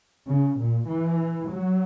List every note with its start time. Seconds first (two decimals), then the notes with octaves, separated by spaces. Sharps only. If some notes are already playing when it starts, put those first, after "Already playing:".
0.27 C#3
0.58 A#2
0.88 E3
1.49 F#3